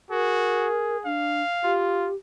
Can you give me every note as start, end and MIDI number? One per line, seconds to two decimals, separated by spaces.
0.11 0.68 66
0.11 1.09 68
0.11 0.97 70
1.05 1.42 62
1.05 1.78 77
1.64 2.10 65
1.64 2.15 67